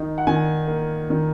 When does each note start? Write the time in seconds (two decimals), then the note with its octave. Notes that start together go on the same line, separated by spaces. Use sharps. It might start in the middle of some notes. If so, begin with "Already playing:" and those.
Already playing: D#3 D#4
0.18 F#5
0.27 D#3 G#5
0.68 A#3
1.10 D#3